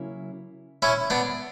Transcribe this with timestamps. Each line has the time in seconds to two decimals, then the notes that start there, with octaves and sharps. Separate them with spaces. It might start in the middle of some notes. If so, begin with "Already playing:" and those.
Already playing: C#3 F#3 A#3 C#4 E4
0.82 C#4 E4
1.10 B3 D4